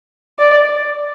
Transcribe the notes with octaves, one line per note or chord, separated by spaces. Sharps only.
D5